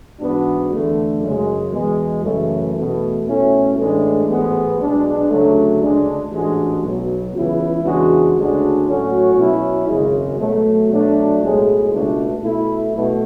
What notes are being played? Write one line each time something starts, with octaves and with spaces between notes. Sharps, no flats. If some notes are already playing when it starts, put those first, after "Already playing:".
G#2 E3 B3 D4 F#4
E2 D3 A3
F#2 C#3 G#3
E2 B2 G#3
F#2 C#3 E3 A3
E2 B2 A3
B2 A3 C#4 E4
A2 E3 G#3 D4
A1 G#2 G#3 B3
B1 B2 G#3 D4
D2 C#3 F#3 A3 D4
D2 C#3 G#3 D4
A1 G#2 G#3 D4 F#4
B1 B2 F#3
C#2 C#3 E3 B3 E4
E2 C#3 G#3 D4 F#4
D2 C#3 G#3 D4 F#4
A2 F#3 C#4 F#4
B2 F#3 C#4 E4
G#1 F#2 C#3 G#3
B2 F#3 A3
B2 F#3 A3 D4
B1 A2 G#3
C#2 B2 A3 D4 F#4
B2 A3 E4
B1 B2 A3